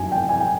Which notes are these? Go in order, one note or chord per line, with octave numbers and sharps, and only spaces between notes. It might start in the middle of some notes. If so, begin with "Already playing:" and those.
Already playing: F#2 D#3 F#3 A#3 G#5
G5
G#5
G5